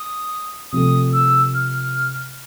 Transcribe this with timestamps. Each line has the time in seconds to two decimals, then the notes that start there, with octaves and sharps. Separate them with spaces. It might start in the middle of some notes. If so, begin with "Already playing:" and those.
Already playing: D#6
0.72 C3 F3 A3 D#6
1.13 E6
1.54 F6